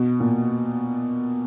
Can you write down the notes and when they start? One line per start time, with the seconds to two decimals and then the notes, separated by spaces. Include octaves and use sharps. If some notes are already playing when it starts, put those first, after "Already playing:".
Already playing: B2
0.20 A#2